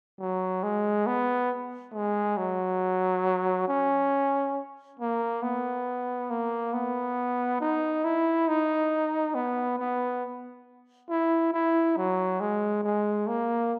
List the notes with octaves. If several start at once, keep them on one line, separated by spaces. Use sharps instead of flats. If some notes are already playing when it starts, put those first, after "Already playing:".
F#3
G#3
B3
G#3
F#3
C#4
A#3
B3
A#3
B3
D#4
E4
D#4
B3
B3
E4
E4
F#3
G#3
G#3
A#3